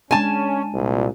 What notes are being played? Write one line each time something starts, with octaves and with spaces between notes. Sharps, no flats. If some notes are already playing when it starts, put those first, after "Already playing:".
G#3 C#4 D4 G#5 A5
C2 A#2